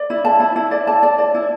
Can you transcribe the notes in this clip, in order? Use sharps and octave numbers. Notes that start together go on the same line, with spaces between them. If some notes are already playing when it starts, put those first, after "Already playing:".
Already playing: D5
E4
A5
E4
E4
D5
A5
D5
D5
E4